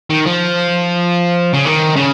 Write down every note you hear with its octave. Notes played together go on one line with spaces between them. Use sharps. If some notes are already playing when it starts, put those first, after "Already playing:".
D#3
F3
C#3
D#3
C#3